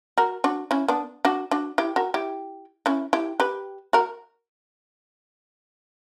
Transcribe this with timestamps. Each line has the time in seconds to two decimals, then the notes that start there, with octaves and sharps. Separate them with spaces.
0.18 F#4 A#4
0.44 D4 F#4
0.71 C#4 E4
0.88 B3 D4
1.25 D4 F#4
1.51 D4 F#4
1.78 E4 G4
1.96 F#4 A#4
2.14 E4 G4
2.86 C#4 E4
3.13 E4 G4
3.40 G4 B4
3.93 F#4 A#4